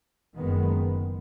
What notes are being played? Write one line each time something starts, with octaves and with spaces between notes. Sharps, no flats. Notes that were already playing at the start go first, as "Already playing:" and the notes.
F#1 F#2 D#3 G#3 B3